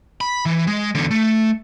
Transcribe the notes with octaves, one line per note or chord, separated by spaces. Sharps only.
B5
E3
G#3
E2 D3
A3